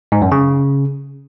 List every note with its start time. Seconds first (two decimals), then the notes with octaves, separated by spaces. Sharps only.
0.12 G#2
0.22 F#2
0.32 C#3